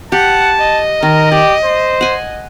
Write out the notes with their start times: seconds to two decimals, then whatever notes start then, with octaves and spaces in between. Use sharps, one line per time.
0.12 G4 F#5 A5
0.59 D#5
1.03 D#3 A#4
1.32 G4 D5
1.65 C5
2.01 F#5 G#5